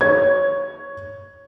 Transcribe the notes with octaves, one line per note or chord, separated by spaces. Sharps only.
C#5 G#6